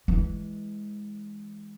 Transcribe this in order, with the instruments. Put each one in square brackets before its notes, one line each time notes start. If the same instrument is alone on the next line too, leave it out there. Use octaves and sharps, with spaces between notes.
[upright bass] E3 G#3